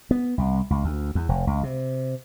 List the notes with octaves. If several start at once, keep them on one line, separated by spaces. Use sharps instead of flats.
B3
C2
C#2
D2
E2
F1
C#2
C3